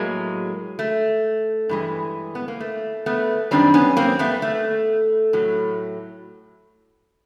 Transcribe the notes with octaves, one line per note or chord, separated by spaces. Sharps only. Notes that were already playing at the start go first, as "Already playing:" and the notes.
Already playing: A2 F#3 G#3 A#3
A3
G2 E3 G#3
B3
A#3
A3
A3 B3
F#2 D#3 G3 C4 D4
B3 C#4
A#3 C4
A3 B3
A3
A2 F#3